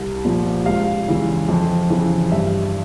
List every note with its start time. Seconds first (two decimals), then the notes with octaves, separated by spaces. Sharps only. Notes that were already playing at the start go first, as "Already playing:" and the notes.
Already playing: C2
0.25 A#2 F3
0.66 C#2 F5
1.08 C#3 E3
1.49 F2
1.90 C#3 E3
2.32 G2 E5